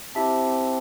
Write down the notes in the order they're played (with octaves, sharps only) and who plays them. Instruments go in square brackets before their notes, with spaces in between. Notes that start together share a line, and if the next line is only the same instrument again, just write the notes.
[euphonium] C4 [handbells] E4 G4 E5 A5